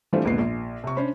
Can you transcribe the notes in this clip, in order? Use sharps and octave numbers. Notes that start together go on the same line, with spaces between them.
E3 G3 A3 C4 D4 F4
A#1 D#2 G#2 D3 B3 C7
A#1
C3 C#6
C#4 D4 C5 B5